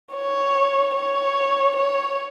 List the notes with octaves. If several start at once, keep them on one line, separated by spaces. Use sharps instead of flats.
C#5
C#5
C#5